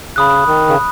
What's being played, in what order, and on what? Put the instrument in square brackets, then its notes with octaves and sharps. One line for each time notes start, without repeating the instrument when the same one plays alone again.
[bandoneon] C#3 [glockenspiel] B5 D#6 F#6
[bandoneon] D#3
C#3